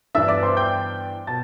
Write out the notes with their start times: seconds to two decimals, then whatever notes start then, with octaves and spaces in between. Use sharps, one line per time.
0.15 G2 E3 B3 D4 E5 E6
0.28 D5 D6
0.43 C5 C6
0.57 G5 G6
1.27 B2 A5 A6